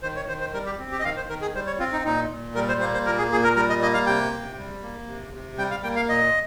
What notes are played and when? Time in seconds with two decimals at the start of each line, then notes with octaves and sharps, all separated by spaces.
0.03 D#3 C5
0.16 C#5
0.28 D#3 C5
0.41 C5
0.54 G3 A#4
0.66 G4
0.79 C4
0.92 G4
1.00 D#5
1.05 D#3 F5
1.17 C5
1.29 D#3 A#4
1.42 G#4
1.55 G3 C5
1.67 C#5
1.79 C4 F4
1.92 D#4
2.05 A#2 D#4
2.30 A#2
2.55 G3 A#4
2.69 C5
2.80 A#3 C5
2.94 C5
3.06 A#2 A#4
3.18 G#4
3.31 A#2 G#4
3.44 A#4
3.56 G3 A#4
3.69 D#5
3.81 A#3 D#5
3.94 F5
4.06 C3 G5
4.32 C3
4.58 G3
4.82 A#3
5.07 C3
5.34 C3
5.58 G3 G5
5.71 F5
5.83 A#3 G5
5.96 F5
6.09 A#2 D#5